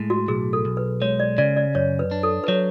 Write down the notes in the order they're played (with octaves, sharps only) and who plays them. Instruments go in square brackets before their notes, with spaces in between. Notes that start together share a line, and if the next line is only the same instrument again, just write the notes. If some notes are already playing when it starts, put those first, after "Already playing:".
Already playing: [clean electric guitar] A2 G#3
[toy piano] F#4
[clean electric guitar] B1 [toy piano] G#4
[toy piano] A4
[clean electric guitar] B1
[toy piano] B4
[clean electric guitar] G#3 [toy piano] C#5
[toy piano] D5
[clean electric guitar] C#3 [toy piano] D5
[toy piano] D5
[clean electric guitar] F#2 [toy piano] C#5
[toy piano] B4
[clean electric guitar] D4
[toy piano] A4
B4
[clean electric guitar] F#3 [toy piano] C#5